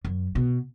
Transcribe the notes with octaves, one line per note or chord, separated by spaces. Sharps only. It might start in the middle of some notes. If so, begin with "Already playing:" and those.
F#2
B2